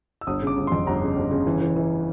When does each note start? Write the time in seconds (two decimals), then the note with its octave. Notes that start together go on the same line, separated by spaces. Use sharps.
0.21 E6
0.27 G1 D#6
0.42 C#3 D6
0.57 G1
0.67 C6
0.72 F2
0.87 G1 A#5
1.02 C#3
1.17 G1
1.31 C#3
1.47 E3
1.61 E3
1.76 E3